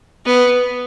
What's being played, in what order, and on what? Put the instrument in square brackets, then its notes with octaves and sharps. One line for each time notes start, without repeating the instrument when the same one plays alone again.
[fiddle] B3